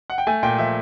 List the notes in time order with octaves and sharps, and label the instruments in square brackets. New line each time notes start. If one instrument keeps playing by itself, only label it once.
[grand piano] F#5
G5
A3 G#5
A#2 G5
F3 E5